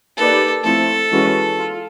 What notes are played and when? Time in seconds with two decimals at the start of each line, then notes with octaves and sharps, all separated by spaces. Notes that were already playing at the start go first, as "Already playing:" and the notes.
0.17 A#3 D#4 G4 A4 B4 D5
0.64 F3 A3 C4 E4 A4
1.12 E3 G#3 C#4 F#4 B4
1.59 F4